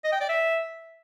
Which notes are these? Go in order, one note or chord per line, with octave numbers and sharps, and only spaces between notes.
D#5
G5
D5
E5